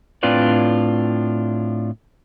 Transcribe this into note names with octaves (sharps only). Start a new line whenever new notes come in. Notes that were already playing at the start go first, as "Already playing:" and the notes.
A2 C4 D4 F4 B4 D5